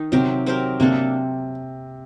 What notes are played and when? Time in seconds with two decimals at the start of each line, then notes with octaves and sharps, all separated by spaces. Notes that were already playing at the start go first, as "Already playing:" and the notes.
Already playing: D#3 D#4
0.12 C3 F#3 C4 G4 A#4
0.46 F#3 C4 G4 A#4
0.80 C3 A#3 D4 A4